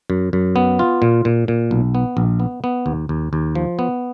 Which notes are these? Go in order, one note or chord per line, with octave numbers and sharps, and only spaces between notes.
F#2
F#2
B3
F4
A#2
A#2
A#2
B1
B3
A#1
B3
B3
D#2
D#2
D#2
F3
B3